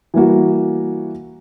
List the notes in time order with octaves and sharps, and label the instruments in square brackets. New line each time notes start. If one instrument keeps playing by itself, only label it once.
[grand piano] E3 G3 A#3 F#4